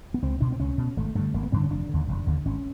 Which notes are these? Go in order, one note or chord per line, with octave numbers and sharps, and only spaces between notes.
B3
C#2 C4
B2 D4
C4
C#2 C#4
B2
G#1 A3
G2 D3 A3
G#1 A#3
B3
G2 D3 C4
C#4
F1 D4
D#2 D3
F1
D#2 D3
G#1 C#4